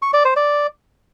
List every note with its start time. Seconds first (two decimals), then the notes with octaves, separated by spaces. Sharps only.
0.02 C#6
0.13 D5
0.25 C5
0.36 D5